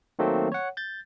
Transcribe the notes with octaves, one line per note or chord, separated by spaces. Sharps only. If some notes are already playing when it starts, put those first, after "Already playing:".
D#3 F#3 A3 A#3 C4
C#5 F#5
G6 A6